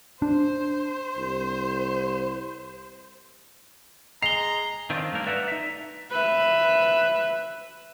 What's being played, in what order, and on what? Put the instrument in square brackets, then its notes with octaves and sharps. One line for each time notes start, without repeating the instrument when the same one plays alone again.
[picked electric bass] D4 [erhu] C5
[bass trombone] C2
[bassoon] G#3 [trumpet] A#5 [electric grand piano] C7 [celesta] F7 G7
[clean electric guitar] D#3 C4 D4 F4
G2 A3 A#3 A#4
B4 D5 E5 F#5 G5 A#5
D#4 E5
[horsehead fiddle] B4 E5